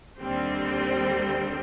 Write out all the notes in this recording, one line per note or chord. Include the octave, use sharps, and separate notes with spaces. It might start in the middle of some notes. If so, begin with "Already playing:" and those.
D#2 D3 G3 C4